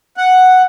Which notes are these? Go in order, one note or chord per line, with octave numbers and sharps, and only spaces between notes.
F#5